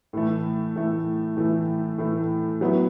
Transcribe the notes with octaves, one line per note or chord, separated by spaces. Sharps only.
A2 E3 A3
A2 E3 A3
A2 E3 A3
A2 E3 A3
F#3 B3 E4